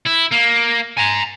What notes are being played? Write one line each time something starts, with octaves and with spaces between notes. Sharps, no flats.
E4
A#3
G#5 A#5